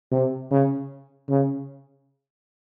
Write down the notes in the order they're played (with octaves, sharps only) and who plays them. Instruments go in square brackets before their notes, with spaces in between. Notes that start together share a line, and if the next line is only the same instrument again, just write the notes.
[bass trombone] C3
C#3
C#3